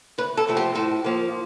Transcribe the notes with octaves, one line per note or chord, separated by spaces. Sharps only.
D2 B4
A4
C3 F3 A3 C4
G4
A2 A4
F3 A#3